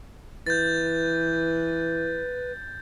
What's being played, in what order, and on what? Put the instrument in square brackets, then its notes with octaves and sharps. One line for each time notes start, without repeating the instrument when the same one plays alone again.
[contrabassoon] E3 [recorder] B4 [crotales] G6 A6